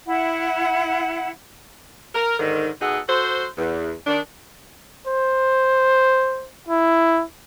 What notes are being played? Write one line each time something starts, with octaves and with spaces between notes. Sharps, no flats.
E4 F#5
A#4
G#2 D3 D#3
B2 D#4 G#4 A4 F#5
F#4 A4 C5
E2
D#3 D4
C5
E4